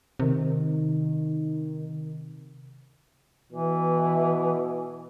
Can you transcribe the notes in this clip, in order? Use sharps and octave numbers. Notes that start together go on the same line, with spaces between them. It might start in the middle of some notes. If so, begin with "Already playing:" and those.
C3 D#3
B2 E3